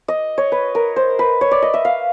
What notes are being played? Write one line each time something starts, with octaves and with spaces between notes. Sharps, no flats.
D#5
C#5
B4
A#4
C5
B4
C#5
D5
D#5
E5
F5